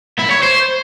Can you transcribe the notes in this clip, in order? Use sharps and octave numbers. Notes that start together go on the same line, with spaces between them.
E4
C#5
C5